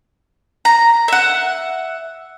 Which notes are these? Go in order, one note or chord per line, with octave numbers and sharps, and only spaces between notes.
A#5
E5 F#5